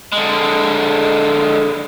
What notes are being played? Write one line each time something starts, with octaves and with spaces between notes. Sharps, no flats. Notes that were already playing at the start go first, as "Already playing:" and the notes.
D3 G#3